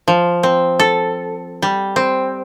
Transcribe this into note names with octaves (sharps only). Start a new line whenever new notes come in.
F3
C4
A4
G3
C4